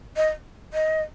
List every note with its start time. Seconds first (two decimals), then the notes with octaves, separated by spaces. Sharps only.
0.16 D#5
0.73 D#5